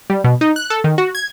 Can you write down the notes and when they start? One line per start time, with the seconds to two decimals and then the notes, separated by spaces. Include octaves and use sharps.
0.10 G3
0.24 B2
0.41 D#4
0.56 F#6
0.70 A4
0.84 D#3
0.98 F#4
1.15 G#6